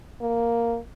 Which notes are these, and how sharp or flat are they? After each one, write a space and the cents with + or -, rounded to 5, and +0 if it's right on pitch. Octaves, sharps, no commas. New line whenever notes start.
A#3 +0